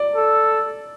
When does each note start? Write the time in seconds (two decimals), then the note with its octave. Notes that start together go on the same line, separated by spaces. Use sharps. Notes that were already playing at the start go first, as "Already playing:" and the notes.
Already playing: D5
0.16 A4